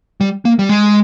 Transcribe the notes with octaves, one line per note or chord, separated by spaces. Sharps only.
G3
A#3
G3
G#3